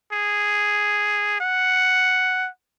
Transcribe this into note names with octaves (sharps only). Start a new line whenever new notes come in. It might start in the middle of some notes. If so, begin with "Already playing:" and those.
G#4
F#5